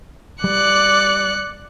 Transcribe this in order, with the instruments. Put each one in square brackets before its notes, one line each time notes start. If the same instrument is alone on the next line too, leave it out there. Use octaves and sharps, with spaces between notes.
[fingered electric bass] G3 [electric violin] D5 C#7 [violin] F#6